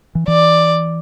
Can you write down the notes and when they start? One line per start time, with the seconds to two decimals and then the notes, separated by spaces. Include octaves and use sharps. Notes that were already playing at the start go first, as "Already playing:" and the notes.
0.15 E3
0.28 E3 D5